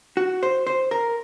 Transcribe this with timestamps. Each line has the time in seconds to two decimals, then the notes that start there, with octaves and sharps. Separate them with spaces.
0.17 F#4
0.43 C5
0.67 C5
0.91 A#4